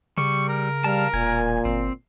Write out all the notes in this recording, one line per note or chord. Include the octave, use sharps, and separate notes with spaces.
C#3 G3 C#6
A#4
G3 F5 A5
E1 A#2 G#5
G1 C4